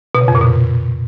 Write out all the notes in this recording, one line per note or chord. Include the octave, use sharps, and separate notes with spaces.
B2
C#3
F2
A#2
B2